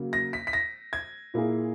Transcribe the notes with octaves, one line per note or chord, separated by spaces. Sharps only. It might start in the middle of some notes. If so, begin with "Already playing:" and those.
Already playing: C#3 F#3 A#3
A#6
B6
B6
A#6
G#6
A#2 A#3 E4 G#4